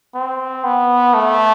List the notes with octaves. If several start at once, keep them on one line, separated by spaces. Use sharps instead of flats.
C4
B3
A3